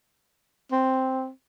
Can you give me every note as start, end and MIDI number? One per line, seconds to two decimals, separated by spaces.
0.72 1.29 60